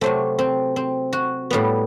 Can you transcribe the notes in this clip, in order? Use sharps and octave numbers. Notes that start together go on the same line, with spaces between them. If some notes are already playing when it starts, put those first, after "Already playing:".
C3 F#3 A3 C4
C4
C4
F#4
A2 G3 B3